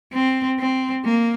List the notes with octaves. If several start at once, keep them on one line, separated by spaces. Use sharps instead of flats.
C4
C4
A#3